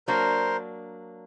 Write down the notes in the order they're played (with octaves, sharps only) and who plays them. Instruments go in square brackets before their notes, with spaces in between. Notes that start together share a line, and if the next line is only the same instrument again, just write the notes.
[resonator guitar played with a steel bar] F#3 A#3 D4 [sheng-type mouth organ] A#4 C5